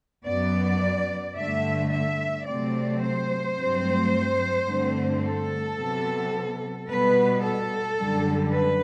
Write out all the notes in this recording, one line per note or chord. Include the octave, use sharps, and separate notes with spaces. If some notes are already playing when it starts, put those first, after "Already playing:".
F#2 F#3 B3 D5
G2 D3 A3 E5
E5
C3 F#3 A3 C4 D5
C5
G2 F#3 A3 C4
G2 D3 A3 C4
A4
C3 F#3 B3
B2 G3 B3 B4
A4
F#2 D3 G3
B4